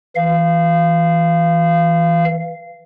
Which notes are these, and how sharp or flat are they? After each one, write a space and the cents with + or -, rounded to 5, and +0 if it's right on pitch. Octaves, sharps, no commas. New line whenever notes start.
E3 +0 F5 -20